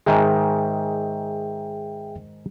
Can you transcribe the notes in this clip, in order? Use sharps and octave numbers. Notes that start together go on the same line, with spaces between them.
G#2 D#3 G#3 G#4 E5 G5